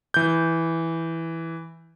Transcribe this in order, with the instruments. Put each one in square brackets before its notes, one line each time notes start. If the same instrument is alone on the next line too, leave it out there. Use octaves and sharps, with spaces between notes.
[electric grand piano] E3 G6